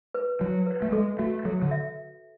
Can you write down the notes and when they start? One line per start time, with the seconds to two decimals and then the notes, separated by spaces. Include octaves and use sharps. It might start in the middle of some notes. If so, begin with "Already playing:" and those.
0.14 B4
0.41 F#3 F#4
0.66 B4
0.82 A3
0.92 G#3 A4
1.19 A3 F#4
1.45 F#3 A4
1.62 D3
1.71 E5